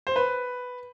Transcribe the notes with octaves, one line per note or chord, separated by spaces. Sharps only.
C5
B4